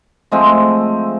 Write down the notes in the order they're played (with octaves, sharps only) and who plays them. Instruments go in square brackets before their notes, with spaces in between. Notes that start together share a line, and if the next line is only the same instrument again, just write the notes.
[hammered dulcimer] F3 G#3 A3 C4